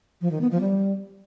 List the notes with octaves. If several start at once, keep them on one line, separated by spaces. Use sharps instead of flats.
F3
D#3
B3
F3
G3